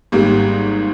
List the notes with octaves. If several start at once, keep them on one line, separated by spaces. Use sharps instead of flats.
G#1 G#2 G3 A#3